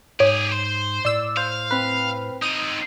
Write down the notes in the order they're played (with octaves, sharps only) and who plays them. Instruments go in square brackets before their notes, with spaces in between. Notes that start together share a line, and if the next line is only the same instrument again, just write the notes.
[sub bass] G#2 [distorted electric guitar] G4 G#4 [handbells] C#5
[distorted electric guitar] C5
[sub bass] A2 [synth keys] D5 E6
[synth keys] C5 [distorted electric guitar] F5
[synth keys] C4 B4
[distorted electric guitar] C4 D#4 [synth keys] D#6 D7 D#7